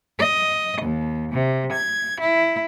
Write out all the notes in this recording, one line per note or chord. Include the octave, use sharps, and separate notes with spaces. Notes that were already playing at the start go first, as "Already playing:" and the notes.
D#5
D#2
C3
G#6
E4